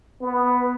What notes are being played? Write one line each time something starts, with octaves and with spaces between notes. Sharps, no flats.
B3